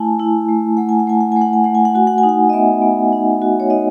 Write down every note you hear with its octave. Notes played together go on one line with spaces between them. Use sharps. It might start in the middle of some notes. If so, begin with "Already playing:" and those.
Already playing: A3 E4 G#5 A5
E4
A3
A3 F#5
G#5
F#5
A3 G#5
F#5
A3 G#5
F#5
G#5
A3 F#5
G#5
F#5
F#4 G#5
F#5
G#5
D#4
F#5
D#5
B3 E5
B3
D#4
F#4
C#5
D#4 D#5